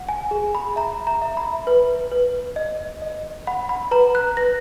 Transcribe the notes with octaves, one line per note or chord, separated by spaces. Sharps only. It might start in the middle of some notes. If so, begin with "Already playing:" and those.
Already playing: F#5
G#5
G#4
B5
E5 A#5
A#5
E5
B5
B4
B4
D#5
D#5
F#5 B5
B5
B4 A#5
F#6
B4 A#6